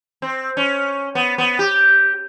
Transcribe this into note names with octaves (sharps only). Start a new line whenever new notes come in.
C4
C#4
B3
B3
G4